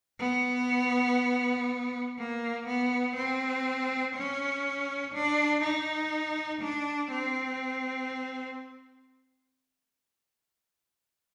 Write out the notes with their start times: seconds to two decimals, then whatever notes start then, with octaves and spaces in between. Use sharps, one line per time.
0.19 B3
2.18 A#3
2.67 B3
3.16 C4
4.15 C#4
5.14 D4
5.63 D#4
6.62 D4
7.11 C4